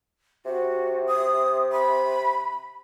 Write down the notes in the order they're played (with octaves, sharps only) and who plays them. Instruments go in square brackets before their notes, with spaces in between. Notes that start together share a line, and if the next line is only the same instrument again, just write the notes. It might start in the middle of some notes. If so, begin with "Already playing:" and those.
[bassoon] C3 [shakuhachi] F#4
[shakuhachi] D#6
B5